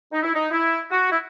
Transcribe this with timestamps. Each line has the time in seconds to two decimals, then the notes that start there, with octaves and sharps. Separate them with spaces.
0.12 D#4
0.23 E4
0.34 D#4
0.52 E4
0.91 F#4
1.11 E4